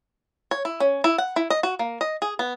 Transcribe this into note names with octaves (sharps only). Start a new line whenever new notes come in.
C#5
E4
C#4
E4
F#5
E4
D#5
F#4
A#3
D#5
G#4
B3